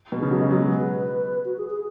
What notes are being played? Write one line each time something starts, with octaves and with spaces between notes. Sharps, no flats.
B2
C#3 G#4
F#3
G#3
F#3
B3
B4
F#4
G#4
G#4